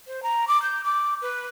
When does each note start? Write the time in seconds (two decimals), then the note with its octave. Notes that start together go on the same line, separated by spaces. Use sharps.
0.07 C5
0.23 A#5
0.48 D6
0.63 G6
0.84 D6
1.22 B4